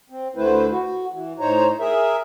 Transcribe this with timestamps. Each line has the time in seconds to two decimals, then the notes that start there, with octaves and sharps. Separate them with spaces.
0.10 C4
0.36 D2 D3 A3 E4 B4 C5
0.70 F#4
1.12 E3
1.40 A2 D#4 C5 C#5 A#5
1.80 G#4 A#4 E5